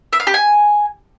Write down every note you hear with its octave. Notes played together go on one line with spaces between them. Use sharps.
E5
F5
G4
G#5